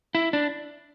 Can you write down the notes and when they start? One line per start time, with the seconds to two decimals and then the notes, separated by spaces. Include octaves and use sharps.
0.15 E4
0.33 D4